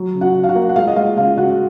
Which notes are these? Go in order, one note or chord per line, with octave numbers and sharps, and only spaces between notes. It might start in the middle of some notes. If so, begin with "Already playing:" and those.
Already playing: F#3
C#3
F#4 F#5
C#3
F5
F#4 F#5
A#3
F#5
G#3 F4 F5
D#5
G#3 F4 F5
C#3 F4 F5
C#3 F#4 F#5